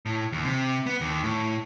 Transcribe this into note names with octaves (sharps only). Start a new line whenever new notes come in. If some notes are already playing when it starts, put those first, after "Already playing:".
A2
D#2
C3
B3
D#2
A2